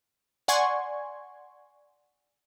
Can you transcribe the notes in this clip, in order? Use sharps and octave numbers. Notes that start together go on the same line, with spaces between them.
D5 F#5 G#5 C6 C#6 G#6